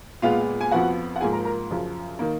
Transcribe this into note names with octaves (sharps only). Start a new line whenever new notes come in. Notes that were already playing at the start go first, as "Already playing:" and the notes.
A#2 G#3 B3 F4 F5
G#5
F2 F3 B3 F#4 F#5
F#5
G#2 F3 A#3 F4 G#4 G#5
A#4 A#5
A#4 A#5
F#2 C#3 F3
D#3 A#3